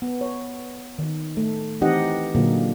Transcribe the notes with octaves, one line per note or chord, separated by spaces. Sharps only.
B3
C#5
D#3
A3
E3 C4 D#4 G4 D#5 F#5
A#2 D3 F#3 A#3